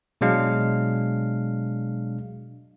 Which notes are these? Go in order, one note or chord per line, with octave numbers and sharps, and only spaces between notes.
B2 F#3 G#3 D4 F5